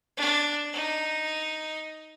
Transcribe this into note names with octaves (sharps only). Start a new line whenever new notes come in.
D4
D#4